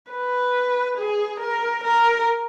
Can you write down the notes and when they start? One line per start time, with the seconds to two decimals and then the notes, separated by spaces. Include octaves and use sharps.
0.11 B4
0.98 G#4
1.40 A#4
1.84 A#4